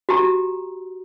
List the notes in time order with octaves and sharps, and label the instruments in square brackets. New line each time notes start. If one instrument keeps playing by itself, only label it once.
[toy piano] F#4 G4 A#5